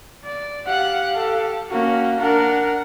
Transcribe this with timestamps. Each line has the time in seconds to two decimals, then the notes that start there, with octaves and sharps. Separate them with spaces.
0.25 D5
0.66 G4 F5 F#5 F#6
1.16 A4
1.70 A#3 C#4 F#4
2.20 D4 A#4 F#5